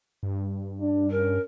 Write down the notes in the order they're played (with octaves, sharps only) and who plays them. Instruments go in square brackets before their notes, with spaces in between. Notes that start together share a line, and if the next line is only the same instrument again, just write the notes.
[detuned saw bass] G2
[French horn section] D4
[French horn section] C#4 [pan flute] A#4